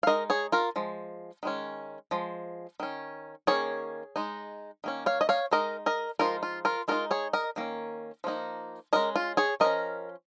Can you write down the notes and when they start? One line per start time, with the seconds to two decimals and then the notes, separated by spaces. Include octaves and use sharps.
0.03 F5
0.07 G#3 D#4 A#4 D#5
0.30 G#4 C#5
0.52 F4 A#4
0.76 F3 G#3
1.43 D#3 G#3 C#4
2.11 F3 G#3
2.80 D#3 C#4
3.47 D#3 A#3 C#4 G#4 C#5
4.16 G#3 D#4
4.84 D#3 A#3 C#4
5.06 C#5 F5
5.21 D#5
5.29 C#5 F5
5.51 G#3 D#4 A#4 D#5
5.86 A#4 D#5
6.19 F3 G#3 D#4 F4 A#4
6.43 F4
6.65 F4 A#4
6.88 G#3 D#4 F4 A#4
7.11 G#4 C#5
7.33 A#4 D#5
7.56 D#3 A#3 C#4
8.24 F3 A#3 D#4
8.93 G#3 C#4 A#4 D#5
9.16 F4
9.37 G#4 C#5
9.60 F3 C#4 A#4 D#5